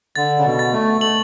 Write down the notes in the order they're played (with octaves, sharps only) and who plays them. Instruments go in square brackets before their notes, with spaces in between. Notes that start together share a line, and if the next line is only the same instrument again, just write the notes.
[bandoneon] D3 [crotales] A6
[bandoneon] C#3
B2
[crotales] A6
[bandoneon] A3
[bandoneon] A3 [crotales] F#7